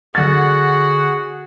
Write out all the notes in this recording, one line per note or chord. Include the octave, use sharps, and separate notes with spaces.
D3 F#4 G#4 F#5 A6